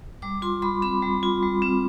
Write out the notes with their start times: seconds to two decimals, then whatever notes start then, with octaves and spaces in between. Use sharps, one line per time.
0.22 G3 D6
0.42 F4 C6
0.62 G3 B5
0.82 C4 B5
1.02 G3
1.23 F4
1.43 G3
1.62 C4